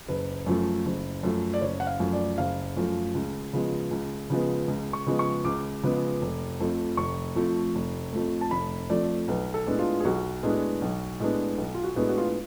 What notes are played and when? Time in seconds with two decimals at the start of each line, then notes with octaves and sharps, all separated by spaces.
0.08 F#1 B4
0.46 F#2 F3 A3
0.85 F#1
1.23 F#2 F3 A3
1.54 D5
1.61 F#1 C#5
1.80 F#5
1.87 F5
2.00 F#2 F3 A3
2.13 D5
2.38 F#1 F5
2.77 F#2 F3 A3
3.15 C#2
3.53 C#3 F3 G#3 B3
3.91 C#2
4.30 C#3 F3 G#3 B3
4.68 C#2
4.93 C#6
5.07 C#3 F3 G#3 B3
5.19 C#6
5.45 C#2 D6
5.83 C#3 F3 G#3 B3
6.22 F1
6.60 F2 F3 A3
6.97 F1 C#6
7.36 F2 F3 A3
7.75 F1
8.13 F2 F3 A3
8.41 A5
8.51 F1 B5
8.90 F2 F3 A3 D5
9.28 B1 B4
9.54 A4
9.67 A2 G#3 B3 D4
9.79 F4
10.00 G#4
10.05 B1 F#4
10.43 A2 G#3 B3 D4
10.82 B1
11.20 A2 G#3 B3 D4
11.58 B1
11.74 F4
11.83 F#4
11.96 A2 G#3 B3 D4
12.09 F#4
12.18 F4